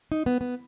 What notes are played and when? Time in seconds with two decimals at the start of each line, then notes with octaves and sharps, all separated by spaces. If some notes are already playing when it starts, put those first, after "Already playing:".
0.12 D#4
0.26 B3
0.41 B3